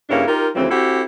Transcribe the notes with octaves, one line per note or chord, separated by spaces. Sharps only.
G2 C#3 A#3 C#4 D4 E4
D#4 F4 G4 A#4
D2 C#3 E3 F3 G3 C4
C4 E4 F#4 G4 A4